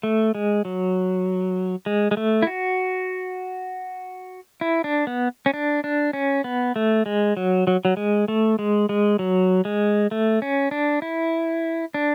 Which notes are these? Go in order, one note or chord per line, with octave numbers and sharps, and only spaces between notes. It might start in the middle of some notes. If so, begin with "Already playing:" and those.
A3
G#3
F#3
G#3
G#3
A3
E4
F#4
E4
D4
B3
C#4
D4
D4
C#4
B3
A3
G#3
F#3
F#3
F#3
G#3
A3
G#3
G#3
F#3
G#3
A3
C#4
D4
E4
D4